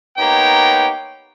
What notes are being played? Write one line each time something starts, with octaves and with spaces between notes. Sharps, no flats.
A#3 B3 D#4 G4 C#5 G5